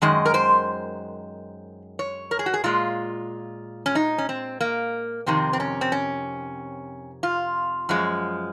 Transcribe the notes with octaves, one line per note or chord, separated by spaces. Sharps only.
F#2 D#3 G#3 D#5
A#4
C5
C#5
A#4
G#4
F#4
G#4
A#2 G#3 F4
C#4
D#4
C#4
C4
A#3
F2 C3 D#3 C4
C4
C#4
C4
C#4
F4
F#2 F3 G#3